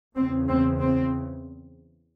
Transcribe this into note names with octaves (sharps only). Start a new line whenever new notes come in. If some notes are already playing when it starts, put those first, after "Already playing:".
E2 C#3 C4
C4
C4